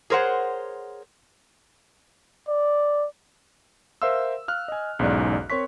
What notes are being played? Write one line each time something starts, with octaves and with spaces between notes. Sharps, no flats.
G#4 A#4 C5 C#5 F#5
D5
A#4 C5 E5 F5 C6 E6
F5 F6 F#6
D#5 G#5
B1 E2 G#2 C#4 D5 F#6
C4 A#4 C#5 C6 C#6 B6